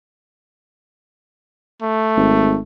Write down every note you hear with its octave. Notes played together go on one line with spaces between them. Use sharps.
A3
G#1